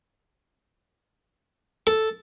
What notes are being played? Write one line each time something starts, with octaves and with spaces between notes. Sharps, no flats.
A4